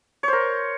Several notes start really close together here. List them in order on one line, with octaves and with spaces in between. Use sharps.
C#5 C5 A#4